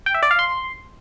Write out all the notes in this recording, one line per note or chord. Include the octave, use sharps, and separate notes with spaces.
G5
E5
D5
F5
C6